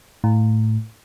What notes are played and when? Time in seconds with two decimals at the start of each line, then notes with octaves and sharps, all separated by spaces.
0.24 A2